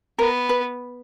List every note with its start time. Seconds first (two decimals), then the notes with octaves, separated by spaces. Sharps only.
0.19 B3 A#4
0.49 B4